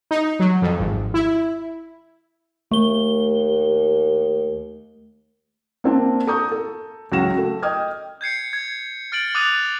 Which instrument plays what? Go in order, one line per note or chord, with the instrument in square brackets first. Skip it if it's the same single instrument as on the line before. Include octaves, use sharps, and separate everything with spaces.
[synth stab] D#4
F#3
F2
G#1
E4
[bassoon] D#2 [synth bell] A3 G7
[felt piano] A#3 C4 D4
A4 A#5 C#6 D#6 G6
A4
C#2 F#3 F#4 A#6 E7
A3
D#5 G5 D#6 F6 G#6
[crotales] G6 G#6 C7 C#7
G#6
F6 A6 D7 F#7
D6 D#6 F#6 A6 D#7 F7